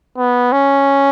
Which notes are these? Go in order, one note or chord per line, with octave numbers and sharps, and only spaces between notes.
B3
C#4